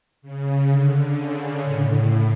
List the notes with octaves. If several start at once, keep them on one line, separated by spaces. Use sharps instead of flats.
C#3
D3
C#3
A2